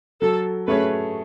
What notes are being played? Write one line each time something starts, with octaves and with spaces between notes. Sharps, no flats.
F#3 A4
A3 C#4 G#4 B4